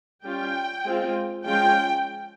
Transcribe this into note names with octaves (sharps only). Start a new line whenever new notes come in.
G3 C#4 F4 G5
G#3 C4 F4
F3 G#3 C#4 F4 G5